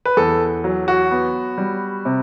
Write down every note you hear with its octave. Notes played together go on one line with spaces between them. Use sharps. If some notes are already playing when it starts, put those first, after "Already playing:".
B4
E2 A4
F#3
F#4
B3
G3
C3